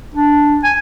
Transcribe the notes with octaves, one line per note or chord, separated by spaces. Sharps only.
D4
G#5